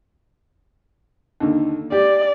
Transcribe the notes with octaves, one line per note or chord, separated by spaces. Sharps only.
D#2 D3
G4 D5